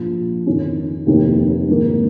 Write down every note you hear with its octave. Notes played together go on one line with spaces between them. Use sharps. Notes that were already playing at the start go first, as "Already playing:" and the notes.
Already playing: A#1 A#2 F3
F2 D#3 C#4
F1 D#2 D#3 A#3
G#2 D#3 A#3